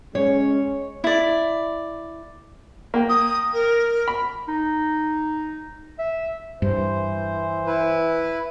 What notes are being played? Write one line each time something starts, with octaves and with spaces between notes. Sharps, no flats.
G#3 C#4 C#5
E4 D5
A#3 G5
D#6
A#4
B5
D#4
E5
G2 E3 C5
E4 B4